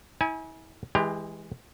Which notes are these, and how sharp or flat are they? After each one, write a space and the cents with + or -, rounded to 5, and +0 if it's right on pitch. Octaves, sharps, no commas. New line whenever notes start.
E4 -40 G#5 +5
E3 -15 G#3 +0 G4 +25